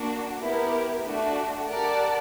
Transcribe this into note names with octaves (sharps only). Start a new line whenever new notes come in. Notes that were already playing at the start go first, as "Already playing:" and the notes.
Already playing: A#3 D4 F#4
B3 E4 G4 A#4
A3 D4 F#4
G4 A#4 D5 F#5 A5